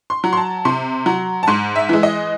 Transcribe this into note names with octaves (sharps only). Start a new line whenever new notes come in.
C6
F#3
C6
A5
C3 C6
F#3
A5
G#2 C6
E5
E3 G#3
D#5